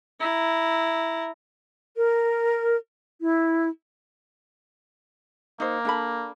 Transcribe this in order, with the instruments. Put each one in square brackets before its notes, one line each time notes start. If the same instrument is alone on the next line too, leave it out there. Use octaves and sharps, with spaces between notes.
[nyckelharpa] E4 A#5
[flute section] A#4
E4
[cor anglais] A#3 [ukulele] D#4 C5
[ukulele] D4 A4 B5